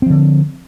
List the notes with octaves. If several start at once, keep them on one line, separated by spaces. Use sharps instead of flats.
D3 F3 C4